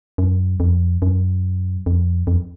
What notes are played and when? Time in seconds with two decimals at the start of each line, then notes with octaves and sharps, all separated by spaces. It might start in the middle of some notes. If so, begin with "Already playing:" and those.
0.18 F#2
0.60 F2
1.02 F#2
1.86 F2
2.27 F2